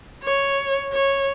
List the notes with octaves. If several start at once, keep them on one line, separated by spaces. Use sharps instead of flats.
C#5
C#5